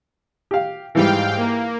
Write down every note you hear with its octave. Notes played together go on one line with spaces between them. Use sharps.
G4 F5
G#2 E3 G3 F5 G5
A#3